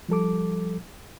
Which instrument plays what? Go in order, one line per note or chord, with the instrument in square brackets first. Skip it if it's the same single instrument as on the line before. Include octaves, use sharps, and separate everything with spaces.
[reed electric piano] F3 G3 A4 D6